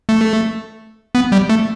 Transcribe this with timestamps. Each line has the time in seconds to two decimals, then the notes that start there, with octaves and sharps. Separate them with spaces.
0.09 A3
1.15 B3
1.32 G3
1.49 A3